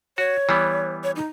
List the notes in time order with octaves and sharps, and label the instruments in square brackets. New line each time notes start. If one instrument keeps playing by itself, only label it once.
[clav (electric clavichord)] F#4 [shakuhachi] C#5
[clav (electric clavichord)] E3 G3 B3
[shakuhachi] C#5
D#4